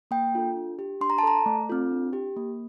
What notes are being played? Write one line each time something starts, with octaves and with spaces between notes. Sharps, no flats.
A#3 G5
D4 F4 A4
D4
G4
D4 C6
A#5
A5
A4 A#5
A3
C4 F4 A4
D4
G4
A#3